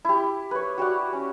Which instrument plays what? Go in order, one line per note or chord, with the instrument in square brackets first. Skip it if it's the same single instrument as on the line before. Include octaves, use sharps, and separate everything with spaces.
[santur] E4 G4
B4 C#5
F#4 G4 D5 F#5
C#4